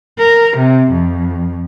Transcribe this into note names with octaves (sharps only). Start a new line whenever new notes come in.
A#4
C3
F2